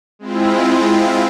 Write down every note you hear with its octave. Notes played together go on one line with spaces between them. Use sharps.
G#3 C4 E4 F4